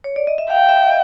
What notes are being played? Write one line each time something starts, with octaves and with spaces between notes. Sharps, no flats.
C#5
D5
D#5
E5
F5 G5
E5
D#5